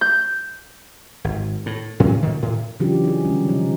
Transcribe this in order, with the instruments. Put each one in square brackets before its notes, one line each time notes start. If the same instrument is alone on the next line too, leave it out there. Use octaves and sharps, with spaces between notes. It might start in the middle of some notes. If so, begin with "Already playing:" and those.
[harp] G6
[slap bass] G#1
A2
A2 F#3 C#4
A#2 D3 D#3
A2
[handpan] C#3 E3 F#3 D4 F4 G4
D#4 G#4
D3 G3 G#3 C#4
C3 F3 D#4
G4